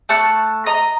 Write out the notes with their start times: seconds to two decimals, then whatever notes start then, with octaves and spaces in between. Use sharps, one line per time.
0.09 A3 A5 C#6 F#6
0.66 D#5 A#5